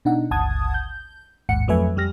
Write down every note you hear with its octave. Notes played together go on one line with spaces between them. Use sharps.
B2 D4 D#4 F#5
G1 C#2 F#5 A5 D#6 G#6
G6
A1 D#2 G#2 F#5 C#7
F2 F#3 A3 B4 E5 G#5
F2 G3 G4 F6 A#6